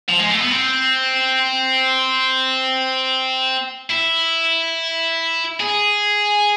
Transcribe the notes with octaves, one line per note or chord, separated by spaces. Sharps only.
F3
G#3
A3
B3
C4
E4
G#4